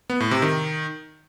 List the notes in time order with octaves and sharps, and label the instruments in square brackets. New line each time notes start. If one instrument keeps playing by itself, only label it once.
[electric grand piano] B3
A2
C3
D#3